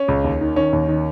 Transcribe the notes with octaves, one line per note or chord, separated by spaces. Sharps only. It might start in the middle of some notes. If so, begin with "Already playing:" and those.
Already playing: C#4
C#2
D#2
D#3
D#3 C#4
D#2
D#3